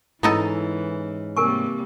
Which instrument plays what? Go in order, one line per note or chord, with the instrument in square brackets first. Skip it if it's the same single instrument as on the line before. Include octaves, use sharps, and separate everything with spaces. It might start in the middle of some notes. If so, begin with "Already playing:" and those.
[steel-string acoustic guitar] G#2 C#4 [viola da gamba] E3 [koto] B3 D#4 A4 [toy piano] E4
[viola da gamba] C3 G3 A#3 [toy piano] A#4 G#5 C#6